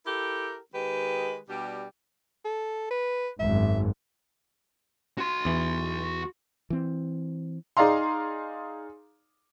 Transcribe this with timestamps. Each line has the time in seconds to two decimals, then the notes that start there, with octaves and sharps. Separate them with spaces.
0.06 E4 G4 A4 A#4
0.74 D#3 G#3 G4 B4
1.49 B2 G3 D4 G4
2.45 A4
2.90 B4
3.39 G#1 F#2 E5
5.18 F#4 C6
5.45 E2 E3
6.70 E3 C4
7.77 D#4 G#4 D5 F5 A#5 C6